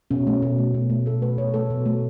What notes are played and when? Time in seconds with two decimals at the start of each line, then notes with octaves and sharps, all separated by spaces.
0.11 B2 C#4
0.27 A3
0.42 B2
0.58 A3
0.74 B2
0.90 A3
1.06 B2 A4
1.22 A3 B4
1.38 B2 C#5
1.54 A3 A4
1.70 B2
1.86 A3